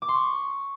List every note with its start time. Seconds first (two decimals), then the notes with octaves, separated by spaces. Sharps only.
0.02 D6
0.08 C6
0.15 C#6